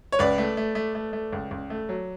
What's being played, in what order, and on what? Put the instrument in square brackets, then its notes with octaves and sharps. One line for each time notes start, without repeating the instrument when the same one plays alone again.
[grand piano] C#5
C#2 B4 D5
A3
A3
A3
A3
A3
C#2
C#2
A3
F#3